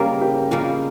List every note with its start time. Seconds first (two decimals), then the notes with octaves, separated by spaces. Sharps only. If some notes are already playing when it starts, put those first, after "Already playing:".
Already playing: C#3 G3 A#3 C#4 G4 A#4
0.21 G4
0.51 C#3 G3 A#3 C#4 F4